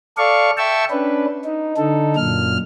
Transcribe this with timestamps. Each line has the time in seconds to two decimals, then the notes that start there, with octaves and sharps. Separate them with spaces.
0.18 A4 D5 F5 C#6
0.58 E5 G5 A5 C#6 E6
0.91 C#4 D4 B4
1.44 D#4
1.77 D3 D#4 A4
2.16 F#2 A#2 F6